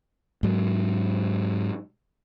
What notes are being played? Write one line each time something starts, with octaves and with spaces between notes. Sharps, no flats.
G#2 F#3